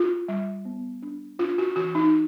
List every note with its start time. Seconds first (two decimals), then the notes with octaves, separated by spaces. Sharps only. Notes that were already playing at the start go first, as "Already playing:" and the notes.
Already playing: F4
0.28 G3
0.65 B3
1.02 D4
1.39 D4 F4
1.58 F#4
1.76 E3 F#4
1.95 D#4